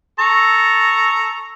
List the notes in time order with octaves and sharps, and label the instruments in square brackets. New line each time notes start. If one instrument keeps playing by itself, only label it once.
[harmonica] A4 A#5 C#6